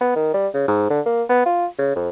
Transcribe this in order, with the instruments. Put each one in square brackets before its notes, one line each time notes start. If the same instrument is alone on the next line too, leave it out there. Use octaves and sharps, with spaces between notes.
[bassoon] B3
D#3
G3
C#3
G#2
D3
A#3
B3
F4
C#3
F2